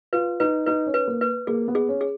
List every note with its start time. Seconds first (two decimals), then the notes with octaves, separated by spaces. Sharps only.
0.13 F4 B4
0.40 D#4 B4
0.66 D#4 B4
0.87 C#4
0.94 B4
1.07 A#3
1.21 B4
1.47 A#3 G#4
1.68 B3
1.75 G#4
1.89 C#4
2.01 G#4